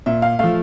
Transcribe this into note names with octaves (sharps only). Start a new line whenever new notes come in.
A#2 E5
F5
F3 A3 F5